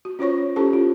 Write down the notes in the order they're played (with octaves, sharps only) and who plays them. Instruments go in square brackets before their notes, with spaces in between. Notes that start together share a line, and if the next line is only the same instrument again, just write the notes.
[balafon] F#4
C#4 F4 C5 C#5 C#6
C#4 E4 G4 A4 C5 A5
F4